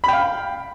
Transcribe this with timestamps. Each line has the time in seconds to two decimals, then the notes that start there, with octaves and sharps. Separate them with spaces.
0.04 B5
0.08 G5
0.13 F5